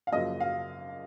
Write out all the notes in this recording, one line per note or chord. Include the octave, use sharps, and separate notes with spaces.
F5
F#1 F#2 C#3 F3 A#3 D#5
F5